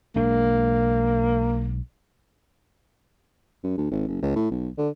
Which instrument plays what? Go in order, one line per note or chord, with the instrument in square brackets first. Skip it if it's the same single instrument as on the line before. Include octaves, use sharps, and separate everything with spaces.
[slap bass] B1 G#3 D4 [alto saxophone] A#3
[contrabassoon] F#2
D2
G#1
F#1
C#2
A2
B1
D3